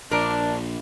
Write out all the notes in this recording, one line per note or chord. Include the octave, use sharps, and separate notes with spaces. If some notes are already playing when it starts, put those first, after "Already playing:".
A#1 D4 A#4